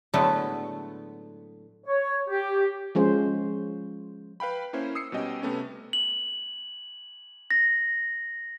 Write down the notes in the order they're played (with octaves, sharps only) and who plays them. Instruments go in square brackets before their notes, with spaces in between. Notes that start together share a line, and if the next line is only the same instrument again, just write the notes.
[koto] A2 D3 F#3 G#3 A3 B3
[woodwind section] C#5
G4
[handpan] F3 G#3 C#4 C5
[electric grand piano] B4 F5 G5 B5
A#3 C#4 E4 C5
D#6 E6 C7 C#7
B2 G3 C#4 D#5 G5
C3 A3 B3 C#4
[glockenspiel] F#7
A#6